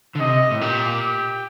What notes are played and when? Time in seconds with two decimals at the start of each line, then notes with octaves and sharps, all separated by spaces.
0.15 D3
0.20 C3 D#5
0.51 A2
0.61 A#2 G4